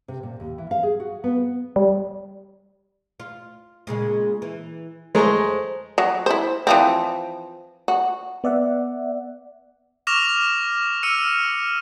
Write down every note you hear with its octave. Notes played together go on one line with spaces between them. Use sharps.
C3
A#2
D#2
E3
F5
G#4
F#4
B3
G3
F4
A#2 C#3 G#3
E3
F2 G#3 A3 C5 A#5
F#3
E4 C5
E3 F3 C4
F#4
B3 D5 E5 F#5
C#6 D6 F6 A#6 E7 F7
E6 F6 C#7 D#7